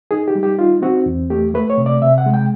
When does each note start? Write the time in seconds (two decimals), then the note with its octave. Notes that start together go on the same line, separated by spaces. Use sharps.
0.11 D#4 G#4
0.28 G4
0.35 G3
0.43 G4
0.59 D#4 F4
0.82 C4 F#4
1.06 E2
1.30 A3 G4
1.54 A3 B4
1.70 C#5
1.78 C3
1.86 D5
2.02 C3 E5
2.18 F#5
2.26 G#3
2.34 G5